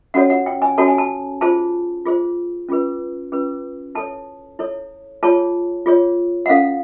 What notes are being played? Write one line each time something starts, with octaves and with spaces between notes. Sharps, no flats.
C#4 F#4 A4 C#5 F#5
F#5
G5
G#5
C#4 F#4 A4 C#5 A5
G#5
A5
F4 G#4 C5 A5
F4 G#4 C5
C#4 F4 G#4 B4
C#4 F4 G#4 B4
E4 A4 C#5 A5
E4 A4 C#5
F4 G#4 C#5 A5
F4 G#4 C#5
F#5
C#4 E4 A4 F5